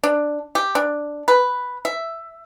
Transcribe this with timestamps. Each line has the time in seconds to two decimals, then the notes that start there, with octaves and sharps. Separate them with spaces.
0.03 D4
0.55 G4
0.75 D4
1.28 B4
1.85 E5